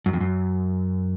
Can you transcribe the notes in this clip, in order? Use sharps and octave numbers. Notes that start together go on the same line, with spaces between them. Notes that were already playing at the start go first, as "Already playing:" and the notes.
F#2
F2
F#2